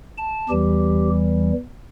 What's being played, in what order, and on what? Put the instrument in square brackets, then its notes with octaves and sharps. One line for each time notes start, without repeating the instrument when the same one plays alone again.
[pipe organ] A5
E2 E3 G3 G4